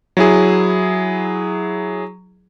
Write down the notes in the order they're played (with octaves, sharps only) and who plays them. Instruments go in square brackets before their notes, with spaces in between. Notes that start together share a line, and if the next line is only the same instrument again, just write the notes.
[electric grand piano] F#3 E4 G#4